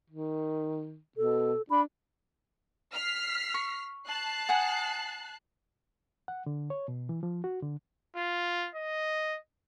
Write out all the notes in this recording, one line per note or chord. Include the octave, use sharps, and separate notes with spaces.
D#3
B2 A4
D4 B5
F6 B6 C7
C#6
A5 F#6 C7
F#5 G#5 D#6
F#5
D3
C#5
B2
E3
F3
F#4
D3
F4
D#5